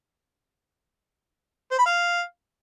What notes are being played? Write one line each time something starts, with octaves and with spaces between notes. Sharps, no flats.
C5
B5
F5